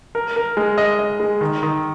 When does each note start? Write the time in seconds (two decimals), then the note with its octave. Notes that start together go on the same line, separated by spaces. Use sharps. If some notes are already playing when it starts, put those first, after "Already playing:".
0.15 A#4
0.36 A#4
0.57 G#3
0.78 D#5
0.99 D#5
1.20 G#3
1.41 D#3
1.63 D#3